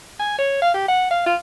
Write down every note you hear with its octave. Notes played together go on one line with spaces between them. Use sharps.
G#5
C#5
F5
G4
F#5
F5
F4